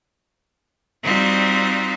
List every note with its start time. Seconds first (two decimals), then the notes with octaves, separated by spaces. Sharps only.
1.03 G3 C4 D#4 F4 F#4